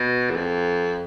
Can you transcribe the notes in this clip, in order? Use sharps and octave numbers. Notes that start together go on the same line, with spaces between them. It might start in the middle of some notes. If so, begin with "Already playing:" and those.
Already playing: B2
E2
F2